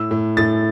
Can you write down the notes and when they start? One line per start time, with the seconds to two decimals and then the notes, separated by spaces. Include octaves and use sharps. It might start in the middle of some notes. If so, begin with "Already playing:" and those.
Already playing: A2 E6
0.11 A2
0.37 A2 A6